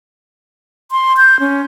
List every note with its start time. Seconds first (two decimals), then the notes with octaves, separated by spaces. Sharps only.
0.91 C6
1.17 G6
1.40 C#4